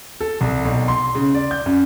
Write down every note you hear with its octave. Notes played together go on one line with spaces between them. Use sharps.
A4
C2
B1
C6
C#3
D5
G6
F#2